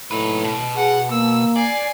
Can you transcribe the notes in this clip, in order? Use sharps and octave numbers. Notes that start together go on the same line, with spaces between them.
A2 D#4 B4
B2
G#4 F#5
A#3 E6
D5 G#5 C7